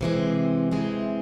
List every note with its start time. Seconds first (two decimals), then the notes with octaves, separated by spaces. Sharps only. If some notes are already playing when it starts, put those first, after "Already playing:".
0.01 C3 E3 G#3 C4
0.71 C3 E3 G#3 C4